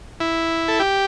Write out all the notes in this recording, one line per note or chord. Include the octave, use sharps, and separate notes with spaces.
E4
A4
G4